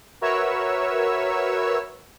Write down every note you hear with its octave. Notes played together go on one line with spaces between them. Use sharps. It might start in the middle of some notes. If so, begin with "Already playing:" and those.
F#4 A#4 B4 C#5 E5 E6